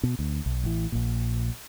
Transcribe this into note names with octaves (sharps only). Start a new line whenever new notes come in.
B2
D2
B1
A1 E3
A#1 A#2